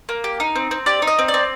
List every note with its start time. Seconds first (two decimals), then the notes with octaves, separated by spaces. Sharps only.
0.09 A#3
0.24 G4
0.40 D#4
0.55 C4
0.71 C4
0.86 G4 D5
1.02 D#4
1.07 D#5
1.19 C4
1.28 D5
1.34 C4